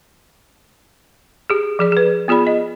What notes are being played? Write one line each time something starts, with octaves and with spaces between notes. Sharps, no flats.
G4 G#4
F3 G#4 D5
G#4 B4
B3 F4 G#4 D5 B5
D#5